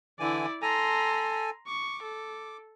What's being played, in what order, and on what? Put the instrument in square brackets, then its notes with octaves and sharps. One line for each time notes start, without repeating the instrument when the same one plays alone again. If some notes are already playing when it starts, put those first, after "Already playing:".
[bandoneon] D3 E3 G#5 [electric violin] E4 D5
[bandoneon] A4 G#5 [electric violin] A#5 C6
[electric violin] C#6 [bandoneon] D6
[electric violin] A4